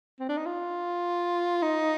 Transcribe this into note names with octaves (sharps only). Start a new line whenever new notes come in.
C4
D4
D#4
F4
D#4